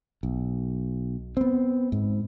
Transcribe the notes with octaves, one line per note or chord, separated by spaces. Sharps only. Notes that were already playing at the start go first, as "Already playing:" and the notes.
B1
B3 C4
G#2